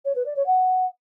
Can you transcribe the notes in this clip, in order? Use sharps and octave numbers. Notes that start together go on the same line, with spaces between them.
C#5
B4
D5
C#5
F#5